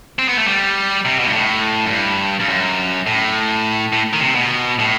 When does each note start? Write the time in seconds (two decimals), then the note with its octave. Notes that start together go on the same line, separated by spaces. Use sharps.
0.19 C4
0.28 B3
0.37 A3
0.47 G3
1.05 C3
1.19 B2
1.27 G2
1.33 A2
1.85 F#2
1.91 G2
2.40 G2
2.49 F#2
3.07 A2
3.93 A2
4.13 D#3
4.21 C3
4.35 B2
4.79 A2